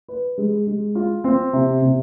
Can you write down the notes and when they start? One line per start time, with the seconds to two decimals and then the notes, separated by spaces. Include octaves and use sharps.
0.08 B4
0.38 G#3
0.67 G#3
0.95 F4
1.24 C4
1.53 C3
1.82 C3